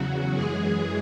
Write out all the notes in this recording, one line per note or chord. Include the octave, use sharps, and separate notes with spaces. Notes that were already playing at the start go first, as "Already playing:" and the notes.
Already playing: E2 C#3 F#3 F#4
F#2 E3 G#3 G#4